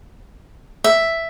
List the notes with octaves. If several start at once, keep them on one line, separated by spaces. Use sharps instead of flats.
E5